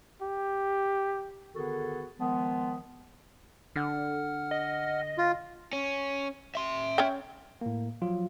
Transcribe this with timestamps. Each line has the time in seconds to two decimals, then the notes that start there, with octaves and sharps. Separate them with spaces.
0.22 G4
1.55 D3 D#3 B3 F#4 G#4 A4
2.20 D#3 F3 G#3 B3
3.76 D3 F#5 F6
4.51 D#5
5.18 F4
5.73 C#4
6.55 E5 C6
6.98 C#4 C#5 G5
7.61 A2 A#3
8.02 F3 F#3 F4